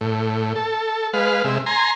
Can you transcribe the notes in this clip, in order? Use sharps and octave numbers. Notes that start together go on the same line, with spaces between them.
A2
A4
G#3 B4 F5
C3 G#3 E5
G#5 A#5 C6